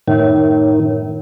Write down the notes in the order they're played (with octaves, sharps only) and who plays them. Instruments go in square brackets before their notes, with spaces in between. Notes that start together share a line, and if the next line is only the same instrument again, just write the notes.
[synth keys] F#2 A2 [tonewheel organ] D#3